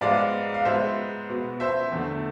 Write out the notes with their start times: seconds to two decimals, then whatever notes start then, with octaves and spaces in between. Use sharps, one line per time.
0.01 G#2 G#3 B3 D5 F5
0.54 F5
0.65 G#2 G#3 B3 C5 E5
1.29 B2 B3
1.60 C5 E5
1.92 E2 D3 A3